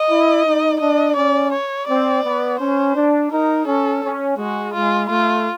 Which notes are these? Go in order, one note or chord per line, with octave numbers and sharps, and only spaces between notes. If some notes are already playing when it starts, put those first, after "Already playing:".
Already playing: D#5
E4
D#4
D4 D#5
C#4 D5
C#5
C4 D5
B3
C#4 C5
D4
D#4 A#4
C#4 A4
C#4
G#3 F#4
G#3 F4
A3 F4